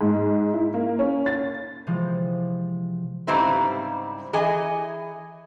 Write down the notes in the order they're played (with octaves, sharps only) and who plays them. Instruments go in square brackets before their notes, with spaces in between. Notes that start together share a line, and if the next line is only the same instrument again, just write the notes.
[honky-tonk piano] G#2
E4
A#3
C#4
A6
[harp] C3 E3 F3 G#3
[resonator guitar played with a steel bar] G#2 C#3 G3 C4 E4 B4
E3 G#4 D#5 G#5